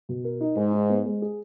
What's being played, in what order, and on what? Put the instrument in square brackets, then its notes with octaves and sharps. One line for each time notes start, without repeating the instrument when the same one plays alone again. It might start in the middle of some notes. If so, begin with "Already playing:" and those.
[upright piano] B2
A#4
D#4
[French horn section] G#2 [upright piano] G#4
[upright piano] D#4
B3
G#3
G#4